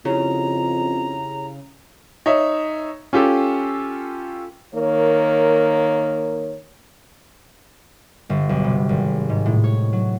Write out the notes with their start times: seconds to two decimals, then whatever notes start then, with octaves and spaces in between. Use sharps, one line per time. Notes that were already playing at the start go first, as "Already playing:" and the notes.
0.05 F2 C#3 E4 G4 C#5 A#5
2.26 D#4 C#5 E5
3.13 C#4 F4 G4 A4
4.75 D#3 A#3 C#5
8.30 G1
8.49 B1
8.64 C3
8.89 G#1
9.29 G#2
9.46 A2
9.64 C#5
9.93 F#3